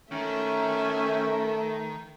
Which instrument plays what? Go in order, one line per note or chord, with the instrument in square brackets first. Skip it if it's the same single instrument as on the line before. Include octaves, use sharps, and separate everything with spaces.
[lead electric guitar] D#3 [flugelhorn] A3 [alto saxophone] C#4 [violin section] E5